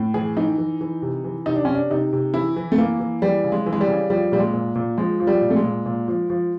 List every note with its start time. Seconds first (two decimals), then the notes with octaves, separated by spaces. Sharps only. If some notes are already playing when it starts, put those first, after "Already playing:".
Already playing: A2
0.14 E3 G#4
0.37 E3 D#4
0.58 E3
0.81 E3
1.02 C3
1.24 E3
1.46 C3 D#4
1.56 D4
1.65 C3 C#4
1.75 D4
1.90 C3 D#4
2.13 C3
2.34 E3 E4
2.56 E3
2.72 A3
2.78 E3 A#3
3.00 E3
3.22 E3 G3
3.44 C#3
3.52 G#3
3.66 E3
3.73 G#3
3.81 G3
3.87 C#3
4.10 F3 G3
4.32 A#2 G3
4.39 G#3
4.53 A#2
4.75 A#2
4.98 F3 G#3
5.20 F3
5.27 G3
5.41 A#2
5.50 A3
5.56 G#3
5.64 A#2
5.86 A#2
6.08 F3
6.30 F3